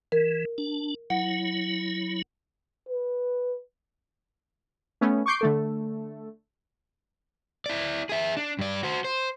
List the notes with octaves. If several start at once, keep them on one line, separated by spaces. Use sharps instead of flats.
E3 A#4
D4
F#3 E4 F#5
B4
A3 B3 C#4
C#6 D6 G6 C7 D7
D3 A3 A4
E4 D5
G#4 E5
D4
G2 D5
F#4 C5
C5